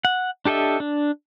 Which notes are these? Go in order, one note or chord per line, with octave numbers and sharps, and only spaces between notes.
F#5
D4 G4 A4 D#5 E5
D4